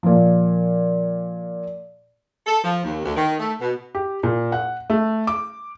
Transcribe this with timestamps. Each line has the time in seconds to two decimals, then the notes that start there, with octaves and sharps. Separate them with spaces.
0.03 A#2 F3
2.47 A4
2.64 F3
2.84 D#2
3.04 D2
3.17 D#3
3.39 A3
3.60 B2
3.95 G4
4.23 A#2
4.52 F#5
4.90 A3
5.27 D6